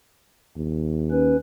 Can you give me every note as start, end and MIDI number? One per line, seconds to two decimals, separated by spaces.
0.57 1.37 39
1.11 1.36 61
1.11 1.36 71